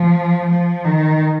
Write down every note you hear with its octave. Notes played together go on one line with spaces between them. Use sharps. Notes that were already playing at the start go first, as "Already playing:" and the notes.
Already playing: F3
F3
D#3